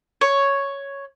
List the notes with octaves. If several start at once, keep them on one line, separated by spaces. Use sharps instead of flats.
C#5